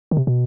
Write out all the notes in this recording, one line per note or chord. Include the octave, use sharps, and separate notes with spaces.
D#3
C3
B2